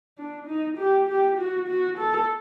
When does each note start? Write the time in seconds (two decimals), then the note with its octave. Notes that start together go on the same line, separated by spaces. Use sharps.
0.18 D4
0.47 D#4
0.78 G4
1.08 G4
1.38 F#4
1.68 F#4
1.98 A4